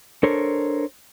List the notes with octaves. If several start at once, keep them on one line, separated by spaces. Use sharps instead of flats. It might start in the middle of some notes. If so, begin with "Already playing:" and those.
D4 A4 A#4 C5 C#5